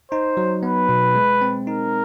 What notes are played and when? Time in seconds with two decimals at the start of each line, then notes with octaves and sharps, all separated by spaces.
0.11 D#4 C5
0.37 F#3
0.63 B3 B4
0.89 B2
1.15 G#3
1.41 C4
1.67 D#4 A#4